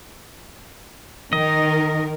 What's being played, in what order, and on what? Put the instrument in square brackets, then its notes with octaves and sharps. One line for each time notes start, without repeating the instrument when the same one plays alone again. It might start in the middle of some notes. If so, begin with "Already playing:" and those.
[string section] D#3 A#4 [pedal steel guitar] D#5